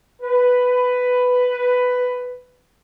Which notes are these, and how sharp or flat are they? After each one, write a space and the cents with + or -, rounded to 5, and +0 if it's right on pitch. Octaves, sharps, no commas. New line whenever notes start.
B4 +10